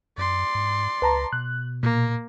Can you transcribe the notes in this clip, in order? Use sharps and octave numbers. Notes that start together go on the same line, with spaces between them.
F#2 D5 C6
G#2
C#2 B4 A5 A#5
B2 F#6
A#2 A#3